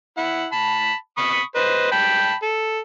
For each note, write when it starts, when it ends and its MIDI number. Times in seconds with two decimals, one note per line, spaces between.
0.17 0.46 64
0.17 0.46 78
0.52 0.94 81
0.52 0.94 83
1.17 1.42 83
1.17 1.42 85
1.17 1.42 87
1.55 1.91 71
1.55 1.91 72
1.55 1.91 75
1.92 2.34 79
1.92 2.34 81
1.92 2.34 83
2.43 2.79 69